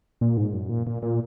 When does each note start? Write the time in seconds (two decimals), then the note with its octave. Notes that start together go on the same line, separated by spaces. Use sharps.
0.21 A#2
0.37 G#2
0.53 F#2
0.69 A#2
0.87 A#2
1.03 A#2